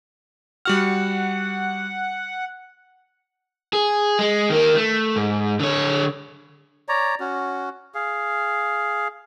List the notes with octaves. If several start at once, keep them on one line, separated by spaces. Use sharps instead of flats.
G3 F#4 F#5 F6
G#4
G#3
D#3 A#3
A3
G#2
D3 C#5
C#5 D5 A#5
C#4 F#4
G#4 F5